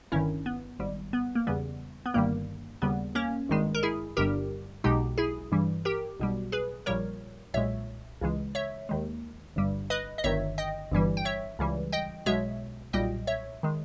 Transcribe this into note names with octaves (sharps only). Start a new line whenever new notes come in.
G1 G2 D#3 C#4 E4
B3
G#1 G#2 G3
B3
A#3
E2 C#3 G3 B3
B3
G1 G2 D#3 G3 A#3
D#2 C#3 G3 B3
A#3 C#4
G#1 G2 D#3 G#3
A#4
E4 G#4
G1 G2 G3 G4 A#4
B1 B2 G#3 D#4 G4
E4 G#4
G2 E3 G3
G4 A#4
B1 B2 G3
G#4 B4
A#1 A#2 G3 A#4 C#5
B1 A#2 G#3 C#5 E5
C#2 C#3 E3 G#3
C#5 E5
D#2 D#3 G#3
G1 G2 G3
B4 D#5
D#5
G1 G2 D#3 C#5 E5
D#5 G5
G1 G2 E3 G3
G5
C#5 E5
C#2 C#3 E3 G3
D#5 G5
B1 B2 G#3 C#5 E5
B1 A#2 G3 D#5 G5
C#5 E5
D#3 G#3